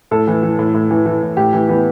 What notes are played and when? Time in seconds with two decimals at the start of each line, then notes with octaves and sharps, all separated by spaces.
0.11 A2 A4
0.27 E3
0.43 E3
0.59 A2
0.74 A2
0.91 E3
1.06 E3
1.22 A2
1.37 A2 G4
1.53 E3
1.69 E3 B3